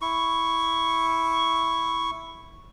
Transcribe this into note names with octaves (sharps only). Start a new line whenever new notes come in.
E4 C#6